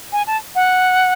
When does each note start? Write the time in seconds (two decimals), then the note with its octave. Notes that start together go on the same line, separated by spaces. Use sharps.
0.13 G#5
0.27 A5
0.55 F#5